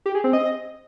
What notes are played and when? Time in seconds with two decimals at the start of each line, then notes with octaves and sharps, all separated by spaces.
0.06 G4
0.15 G#4
0.24 C4
0.33 D#5